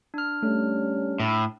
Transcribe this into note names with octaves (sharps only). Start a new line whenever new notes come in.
D4 F6
G3 A3 C#4
A2 B5